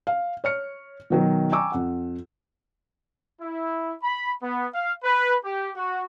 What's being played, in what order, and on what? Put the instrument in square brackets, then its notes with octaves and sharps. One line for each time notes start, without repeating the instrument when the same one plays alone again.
[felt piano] F5
C#5 F6 C#7
B2 D#3 F#3
G5 G#5 A#5 C#6 D6 E6
F2 F#5
[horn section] E4
B5
B3
F5
B4
G4
F#4